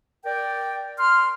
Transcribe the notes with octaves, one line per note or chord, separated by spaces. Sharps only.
A#4 D5 G5
C6 F6